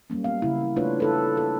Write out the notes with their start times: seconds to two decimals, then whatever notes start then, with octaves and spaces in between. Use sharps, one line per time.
0.10 F#3 G3 A#3 C#4
0.24 B3 F5
0.42 C#3 E4
0.76 A3 D4 F4 B4 C#5
1.00 E4 A4 B4
1.37 A4